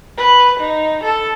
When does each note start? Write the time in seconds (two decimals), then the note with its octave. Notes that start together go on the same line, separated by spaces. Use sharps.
0.18 B4
0.60 D#4
1.04 A4